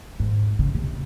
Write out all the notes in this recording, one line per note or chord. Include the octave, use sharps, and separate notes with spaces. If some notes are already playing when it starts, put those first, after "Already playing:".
G#2
C#3
C3